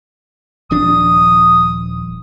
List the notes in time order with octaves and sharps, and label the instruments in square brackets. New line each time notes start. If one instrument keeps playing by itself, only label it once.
[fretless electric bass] D#1 F3 D4 [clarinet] D#6